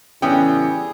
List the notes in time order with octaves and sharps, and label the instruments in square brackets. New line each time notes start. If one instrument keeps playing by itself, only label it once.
[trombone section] A2 C#3 G3 [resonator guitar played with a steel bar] E3 B3 C#4 [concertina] G#4 [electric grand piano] G5